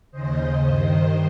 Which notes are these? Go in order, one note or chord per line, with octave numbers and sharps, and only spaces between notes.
D#2 C#3 C5 D#5
G2 D#3